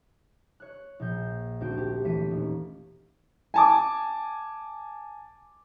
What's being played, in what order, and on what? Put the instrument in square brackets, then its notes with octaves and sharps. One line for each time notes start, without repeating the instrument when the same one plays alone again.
[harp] C#5 F#6
A#1 G6
D2 C4 F#4 G6 D7
G4
E3 A3 C#5 B6 D7 D#7
D#1
[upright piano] G#5 A5 D6